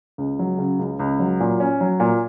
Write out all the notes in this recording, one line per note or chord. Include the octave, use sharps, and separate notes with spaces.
C#2
F#3
C#3
C#2
C#2
F#3
A#2
C#4
F#3
A#2